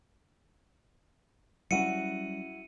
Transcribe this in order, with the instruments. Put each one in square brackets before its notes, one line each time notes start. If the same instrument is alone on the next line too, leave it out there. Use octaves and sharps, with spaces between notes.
[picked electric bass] F#3 G3 C#4 [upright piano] E4 F#4 F#5 [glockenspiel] C#7 D#7